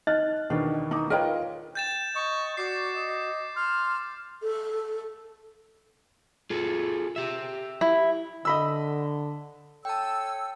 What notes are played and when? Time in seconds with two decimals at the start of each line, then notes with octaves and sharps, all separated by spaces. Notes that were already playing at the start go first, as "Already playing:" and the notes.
0.07 D#4 D#5 A5 F6 F#6 A6
0.50 E2 B2 D#3 D4 C5
0.91 D#4 A5 A#5 D6
1.10 F4 A#4 B4 C#5 D#5 G5
1.75 G5 G6 A6 E7
2.15 D#5 C#6
2.57 F#4 D5 D6 C7
2.95 D#5
3.56 C6 F6
4.42 A4
6.50 F4 G#4 A4
7.16 G4 E5
7.81 E4
8.45 D3 D#5 B5 E6
9.85 A4 C#5 G5 A5 E6